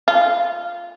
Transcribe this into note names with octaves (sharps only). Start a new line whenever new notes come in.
F4